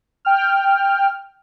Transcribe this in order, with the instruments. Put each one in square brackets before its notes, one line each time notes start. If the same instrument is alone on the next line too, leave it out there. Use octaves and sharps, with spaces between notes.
[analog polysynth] G5 F6